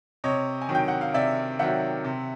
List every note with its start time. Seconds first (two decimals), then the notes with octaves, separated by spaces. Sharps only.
0.24 C3 C#5 D#5
0.62 G#5
0.69 D#3 F#3
0.75 G5
0.88 F#5
1.01 F5
1.14 C3 D5 E5
1.59 D#3 F#3 E5 F#5
2.04 C3